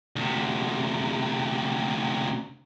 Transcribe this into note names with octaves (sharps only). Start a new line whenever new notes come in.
D2 C3